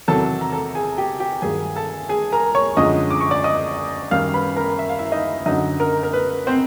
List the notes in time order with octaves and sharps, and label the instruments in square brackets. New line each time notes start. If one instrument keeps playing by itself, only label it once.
[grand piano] E2 C3 D#3 F#3 A4 A5
A#5
A4 A5
G#4 G#5
G4 G5
G4 G5
G2 D#3 F#3 G#4 G#5
A4 A5
G#4 G#5
A#4 A#5
C#5 C#6
F#2 D3 F3 G#3 D#5 D#6
D6
C#6
D5 D6
D#5 D#6
F#2 D#3 G3 F5 F6
B4 B5
A#4 A#5
E5
F5
E4 E5
D#4 D#5
F#2 D3 F#3 D#4 D#5
A#4
A#4
B4
C4 C5